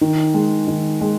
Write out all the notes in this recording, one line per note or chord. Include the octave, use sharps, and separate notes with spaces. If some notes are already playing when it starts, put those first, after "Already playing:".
D#3
G#3
D#3
G#3